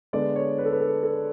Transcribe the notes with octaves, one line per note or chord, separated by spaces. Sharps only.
D3 G#3 B3 D5
C#5
B4
A4
B4
A4
A4